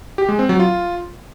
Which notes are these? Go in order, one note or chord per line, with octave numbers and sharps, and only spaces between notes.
G4
G#3
C4
F#3
F4